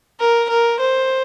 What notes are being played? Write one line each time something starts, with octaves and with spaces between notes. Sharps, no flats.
A#4
A#4
C5